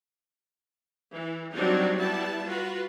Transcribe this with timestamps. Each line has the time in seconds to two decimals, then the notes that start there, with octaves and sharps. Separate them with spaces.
1.14 E3
1.53 F#3 G3 C4 D4 D#4
1.98 G3 B3 E4 A5
2.45 F4 F#4 B4